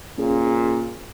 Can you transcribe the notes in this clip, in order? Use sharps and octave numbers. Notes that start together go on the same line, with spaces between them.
A#2 C#4 G#4